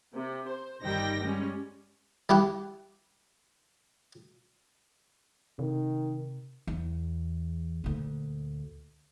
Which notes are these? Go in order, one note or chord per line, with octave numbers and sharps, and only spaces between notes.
C3
C5
G1 G2 D#3 G3 G5 A#6
G3 G#3 C#4
G3 E4 G4 F#5
C3 D#3
E2
D2 A#2